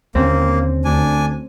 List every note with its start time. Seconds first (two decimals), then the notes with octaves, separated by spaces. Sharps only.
0.15 D#2 D3 A#3 C4 C#4
0.85 D2 D4 G#5